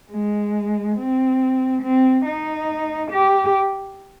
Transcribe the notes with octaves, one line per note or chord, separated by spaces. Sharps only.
G#3
C4
C4
D#4
G4